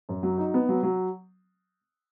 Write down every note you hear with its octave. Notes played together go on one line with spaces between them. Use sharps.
F#2
F#3
D#4
B3
F#3
F#3